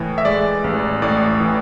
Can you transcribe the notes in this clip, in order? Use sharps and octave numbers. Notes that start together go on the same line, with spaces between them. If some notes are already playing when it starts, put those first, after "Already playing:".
Already playing: A2 E3
E5
G#3 D5
A1
A2 D5
E3